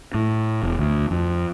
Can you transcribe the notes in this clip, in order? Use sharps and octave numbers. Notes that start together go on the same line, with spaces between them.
A2
E1
D2
F2